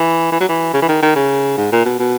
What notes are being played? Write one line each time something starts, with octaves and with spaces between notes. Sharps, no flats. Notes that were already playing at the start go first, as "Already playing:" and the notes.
Already playing: E3
E3
F#3
E3
C#3
E3
D#3
D#3
C#3
G#2
A#2
B2
B2